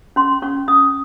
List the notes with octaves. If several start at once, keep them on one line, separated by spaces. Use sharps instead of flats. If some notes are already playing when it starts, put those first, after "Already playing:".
C#4 C6
C#4 C#6
C#4 D#6